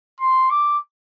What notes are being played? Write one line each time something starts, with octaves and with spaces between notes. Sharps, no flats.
C6
D6